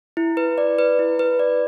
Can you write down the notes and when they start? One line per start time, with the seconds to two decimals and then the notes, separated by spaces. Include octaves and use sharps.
0.17 E4
0.37 B4
0.58 D5
0.79 B4
0.99 E4
1.19 B4
1.39 D5